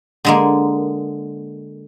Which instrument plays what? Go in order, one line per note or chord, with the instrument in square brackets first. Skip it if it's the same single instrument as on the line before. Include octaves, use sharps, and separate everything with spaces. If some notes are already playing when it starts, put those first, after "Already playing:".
[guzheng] D3 G#3 A#3